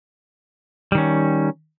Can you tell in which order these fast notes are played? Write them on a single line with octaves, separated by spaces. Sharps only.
G3 D#3 C#4